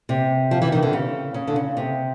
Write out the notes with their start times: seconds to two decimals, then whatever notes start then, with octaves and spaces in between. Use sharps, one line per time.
0.09 C3
0.51 F3
0.62 E3
0.72 D#3
0.82 D3
0.93 C#3
1.34 C#3
1.47 D3
1.56 C#3
1.77 C3